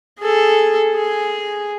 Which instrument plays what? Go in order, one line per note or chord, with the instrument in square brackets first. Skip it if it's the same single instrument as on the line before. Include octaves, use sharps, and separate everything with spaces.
[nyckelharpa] G#4 A4
G#4